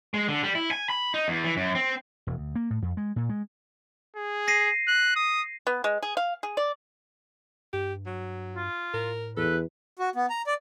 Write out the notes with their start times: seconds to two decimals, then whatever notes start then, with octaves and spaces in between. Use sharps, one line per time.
0.14 G#3
0.28 D3
0.43 G3
0.55 E4
0.71 G#5
0.90 B5
1.14 D#4
1.28 E2
1.44 E3
1.57 F#2
1.75 C4
2.27 E1
2.38 D2
2.56 A#3
2.70 A2
2.82 F2
2.97 G#3
3.16 A#2
3.29 G#3
4.16 G#4
4.48 A#6 C7 D#7
4.88 F#6
5.16 D#6
5.67 B3
5.84 G#3
6.02 G#4
6.17 F5
6.43 G#4
6.57 D5
7.73 G2 G4
8.06 F#3
8.56 F4
8.94 A2 A#4
9.37 E2 A4 B4
9.99 F#4
10.15 B3
10.30 A#5
10.47 D5